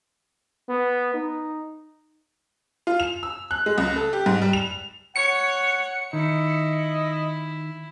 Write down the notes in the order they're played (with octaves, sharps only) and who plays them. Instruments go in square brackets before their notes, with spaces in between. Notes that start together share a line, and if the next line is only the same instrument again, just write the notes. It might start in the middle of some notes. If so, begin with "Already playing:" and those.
[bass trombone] B3
D#4
[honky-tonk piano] F4
F7
E6
F#6
G#3
C#2
A4
G4
G#2
G3
F7
[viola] C#5 [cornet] F#5 [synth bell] C#7
[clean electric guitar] D#3 [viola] E4 [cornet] D#5